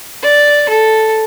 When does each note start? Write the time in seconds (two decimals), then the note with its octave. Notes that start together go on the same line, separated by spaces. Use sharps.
0.23 D5
0.69 A4